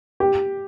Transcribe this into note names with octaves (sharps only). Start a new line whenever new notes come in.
G4